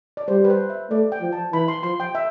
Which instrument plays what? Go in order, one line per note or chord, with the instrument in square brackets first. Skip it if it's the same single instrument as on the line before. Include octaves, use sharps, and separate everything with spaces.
[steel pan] D5
[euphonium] G3 [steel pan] C5
[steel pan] B4
C5
E5
[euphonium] A3 [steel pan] D5
[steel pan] G5
[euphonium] F3
[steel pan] A5
[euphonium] E3 [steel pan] B5
[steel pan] C6
[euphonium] F3 [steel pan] C6
[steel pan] G5
E5